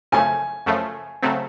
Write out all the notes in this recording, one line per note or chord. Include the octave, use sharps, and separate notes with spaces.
F#2 C#3 F3 A3 G#5
F#2 C#3 F3 A3
C#3 F#3 A3 C4